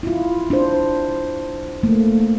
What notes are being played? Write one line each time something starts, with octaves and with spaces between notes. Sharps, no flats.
E4 F4
D4 C5
A3 A#3